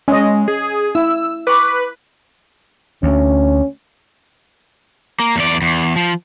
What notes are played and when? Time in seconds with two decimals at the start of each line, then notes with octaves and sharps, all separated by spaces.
0.08 G#3 C#4 D#5
0.48 G#4
0.95 E4 E6
1.47 B4 B5 C#6 D6
3.03 D2 C#4
5.20 A#3
5.36 E2 D5
5.62 E2
5.96 F3